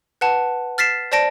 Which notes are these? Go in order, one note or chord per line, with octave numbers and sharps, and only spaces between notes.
B4 F#5 A5
F6 A6 B6 C7 E7
C5 D5 A5 A#6 D7